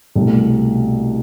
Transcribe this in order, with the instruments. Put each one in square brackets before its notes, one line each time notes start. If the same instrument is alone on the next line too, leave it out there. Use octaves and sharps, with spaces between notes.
[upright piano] C2 B2 A3